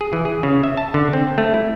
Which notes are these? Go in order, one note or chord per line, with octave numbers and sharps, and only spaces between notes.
G#4
E3
G#4
C#3
E5
A5
D3
C4
A3
E4